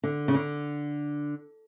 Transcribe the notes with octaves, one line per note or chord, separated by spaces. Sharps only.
D3
C#3
D3